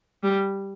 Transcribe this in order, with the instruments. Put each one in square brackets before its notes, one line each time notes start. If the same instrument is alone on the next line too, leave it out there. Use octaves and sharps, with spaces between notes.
[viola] G3